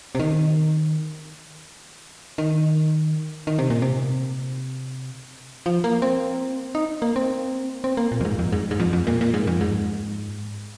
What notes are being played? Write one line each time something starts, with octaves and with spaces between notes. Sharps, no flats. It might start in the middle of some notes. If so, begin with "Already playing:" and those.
C3
D#3
D#3
D#3
C3
A#2
C3
F3
A#3
C4
D#4
A#3
C4
C4
A#3
A#2
F2
G#2
F2
G#2
G#2
F2
F2
A#2
A#2
G#2
F2
G#2